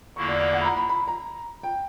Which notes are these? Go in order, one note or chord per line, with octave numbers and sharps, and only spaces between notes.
E2 D3 A#3 E4 C#6
D5
D5
F#5
B5
A#5
B5
B5
A#5
G5